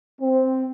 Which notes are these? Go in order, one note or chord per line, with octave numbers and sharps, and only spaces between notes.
C4